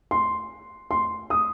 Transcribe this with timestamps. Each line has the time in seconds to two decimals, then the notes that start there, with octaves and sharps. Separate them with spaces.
0.11 C6
0.91 C6
1.30 D#6